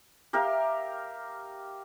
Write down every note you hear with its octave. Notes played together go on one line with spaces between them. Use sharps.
G4 A#4 E5 F5